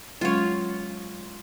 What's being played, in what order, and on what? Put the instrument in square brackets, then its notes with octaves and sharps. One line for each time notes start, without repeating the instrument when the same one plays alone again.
[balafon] F#3 G#3 C#4 [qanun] F4 C#5